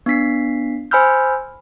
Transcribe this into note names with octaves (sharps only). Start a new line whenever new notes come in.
B3 D4 B6 C7
C5 G#5 B5 E6 F6 G6